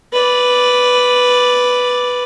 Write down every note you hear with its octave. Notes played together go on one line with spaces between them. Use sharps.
B4 D5